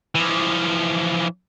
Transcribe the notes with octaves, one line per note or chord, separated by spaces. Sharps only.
E3 F3